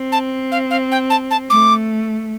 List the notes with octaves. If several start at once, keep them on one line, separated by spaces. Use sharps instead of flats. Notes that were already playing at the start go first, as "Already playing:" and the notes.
Already playing: C4
A5
F5
F5
G5
A5
A5
A3 D6